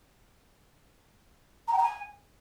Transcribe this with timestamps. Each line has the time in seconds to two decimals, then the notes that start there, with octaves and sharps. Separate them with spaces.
1.67 A#5
1.72 G5
1.78 A#5
1.83 G#5